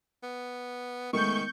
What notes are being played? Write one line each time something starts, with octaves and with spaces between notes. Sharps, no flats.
B3
D#3 G#3 A3 B3 C#6 G6